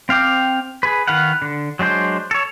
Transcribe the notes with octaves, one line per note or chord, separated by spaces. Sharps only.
C4 F5 G5 D6
G#4 B4
D#3 B4 F5 F#5
D3
F#3 G#3 D4 C5
A4 C#5